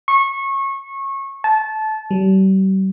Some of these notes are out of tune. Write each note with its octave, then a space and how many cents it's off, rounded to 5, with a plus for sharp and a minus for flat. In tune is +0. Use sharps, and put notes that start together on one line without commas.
C#6 -25
A5 -20
G3 -40